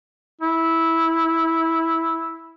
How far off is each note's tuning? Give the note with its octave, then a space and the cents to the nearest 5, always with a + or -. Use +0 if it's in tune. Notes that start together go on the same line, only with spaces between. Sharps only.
E4 -10